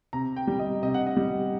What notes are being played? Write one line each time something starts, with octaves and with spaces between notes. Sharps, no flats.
C3 A#5
G5
G3
D#5
C3 D#5
F#5
D#5
G3